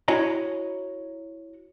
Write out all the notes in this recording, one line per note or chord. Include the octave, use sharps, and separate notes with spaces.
E4 F#4 C#5 D#5 A#5